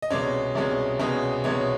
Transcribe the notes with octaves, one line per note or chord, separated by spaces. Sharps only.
D#5
C2 B2 G#3 C#4 D5
C2 B2 G#3 C#4
C2 B2 G#3 C#4
C2 B2 G#3 C#4 C#5